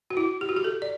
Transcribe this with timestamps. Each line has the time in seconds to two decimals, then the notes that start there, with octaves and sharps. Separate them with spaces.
0.10 F#4
0.17 E4
0.41 G4
0.49 F#4
0.57 G4
0.64 A4
0.82 D5